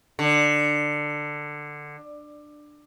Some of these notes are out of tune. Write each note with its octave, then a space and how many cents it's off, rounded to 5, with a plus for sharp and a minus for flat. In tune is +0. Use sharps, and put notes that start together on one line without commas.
D3 +15